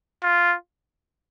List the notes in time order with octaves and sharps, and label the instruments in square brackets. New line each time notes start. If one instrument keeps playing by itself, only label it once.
[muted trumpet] F4